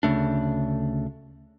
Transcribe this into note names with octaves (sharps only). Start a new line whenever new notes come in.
D2 C#3 A3 D4